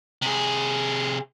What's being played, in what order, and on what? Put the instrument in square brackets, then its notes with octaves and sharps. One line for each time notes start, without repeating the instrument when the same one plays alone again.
[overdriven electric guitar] C3 G#4